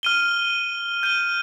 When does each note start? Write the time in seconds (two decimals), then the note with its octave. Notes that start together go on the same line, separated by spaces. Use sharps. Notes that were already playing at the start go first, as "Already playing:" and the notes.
0.03 F6 D#7 G7
1.03 G6 D#7 G7